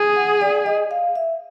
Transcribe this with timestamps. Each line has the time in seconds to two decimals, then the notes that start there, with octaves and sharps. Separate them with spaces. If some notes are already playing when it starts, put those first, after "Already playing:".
Already playing: G#4
0.16 F#5
0.41 D5
0.66 D#5
0.91 F5
1.16 E5